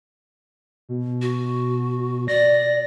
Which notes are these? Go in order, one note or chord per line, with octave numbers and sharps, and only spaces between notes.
B2
F#4
D5 A#6